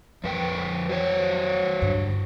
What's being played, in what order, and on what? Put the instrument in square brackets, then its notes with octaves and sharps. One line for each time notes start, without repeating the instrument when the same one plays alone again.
[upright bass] F2 [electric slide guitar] F3 B4 G5
[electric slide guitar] F#3 C5 C#5
[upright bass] G2 D3